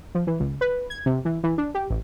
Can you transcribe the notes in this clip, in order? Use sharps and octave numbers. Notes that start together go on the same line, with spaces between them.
F3
E3
C#2
B4
G#6
C3
E3
E3
D4
G4
A1